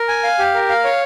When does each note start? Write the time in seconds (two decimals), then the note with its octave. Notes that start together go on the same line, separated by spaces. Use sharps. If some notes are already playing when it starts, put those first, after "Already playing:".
Already playing: A#4
0.08 G#5
0.23 F5
0.39 G4
0.54 A#4
0.69 F5
0.84 C#5